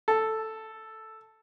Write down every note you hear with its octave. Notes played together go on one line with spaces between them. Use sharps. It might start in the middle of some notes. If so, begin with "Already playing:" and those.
A4